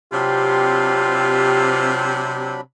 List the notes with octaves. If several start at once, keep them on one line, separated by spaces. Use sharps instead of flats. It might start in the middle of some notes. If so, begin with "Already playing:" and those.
C3 F#3 D4 F4 G4 B5